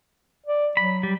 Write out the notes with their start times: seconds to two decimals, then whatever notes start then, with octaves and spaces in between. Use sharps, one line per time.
0.46 D5
0.77 F#3 B5
1.03 G3